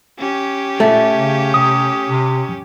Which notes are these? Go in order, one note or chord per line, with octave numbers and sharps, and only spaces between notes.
C#4 G4
A#2 A3
C#3
C3 D#6
C3